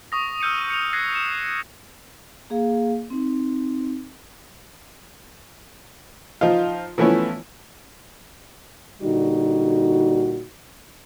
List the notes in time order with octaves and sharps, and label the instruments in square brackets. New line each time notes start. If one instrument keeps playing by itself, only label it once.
[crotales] C#6 D#6 A#6
E6 F6 G6 C#7 D#7
C#7 F7
F#6 G#6 A#6 C7
C#7 E7
[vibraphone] A#3 G#4 F5
C4 D#4
[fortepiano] F3 D#4 F4
E3 F3 A3 B3 C#4 E4
[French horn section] A#2 D3 G3 D#4 F#4